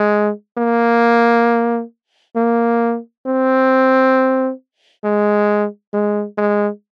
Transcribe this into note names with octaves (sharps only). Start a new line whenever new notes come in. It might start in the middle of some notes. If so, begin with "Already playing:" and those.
Already playing: G#3
A#3
A#3
C4
G#3
G#3
G#3